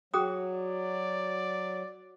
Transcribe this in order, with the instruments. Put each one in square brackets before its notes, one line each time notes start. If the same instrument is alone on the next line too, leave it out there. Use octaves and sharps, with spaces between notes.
[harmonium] F#3 [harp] F#4 [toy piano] G#4 G5 D#6
[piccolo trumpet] D5